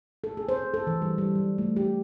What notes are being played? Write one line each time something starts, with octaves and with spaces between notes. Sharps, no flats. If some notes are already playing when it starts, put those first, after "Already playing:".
A4
G#4
C5
A4
E3
G3
G3
F#3
A3
G4